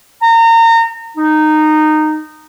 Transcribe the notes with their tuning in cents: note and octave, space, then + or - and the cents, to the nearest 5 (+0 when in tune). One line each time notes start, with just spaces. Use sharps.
A#5 -30
D#4 -15